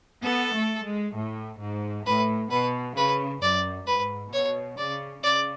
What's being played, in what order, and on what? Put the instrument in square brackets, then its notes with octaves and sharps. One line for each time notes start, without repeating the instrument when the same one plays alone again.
[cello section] B3 [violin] A4
[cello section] A3
G#3
A2
G#2
[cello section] A2 [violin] B4
[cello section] B2 [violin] B4
[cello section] C#3 [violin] B4
[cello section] F#2 [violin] D5
[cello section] G#2 [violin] B4
[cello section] B2 [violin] C#5
[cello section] C#3 [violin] D5
[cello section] C#3 [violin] D5